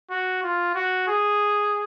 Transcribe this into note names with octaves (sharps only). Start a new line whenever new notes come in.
F#4
F4
F#4
G#4